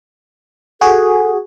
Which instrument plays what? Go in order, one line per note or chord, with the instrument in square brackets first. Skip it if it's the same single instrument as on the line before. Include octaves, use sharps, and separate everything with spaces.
[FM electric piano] F#4 G#4 [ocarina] A4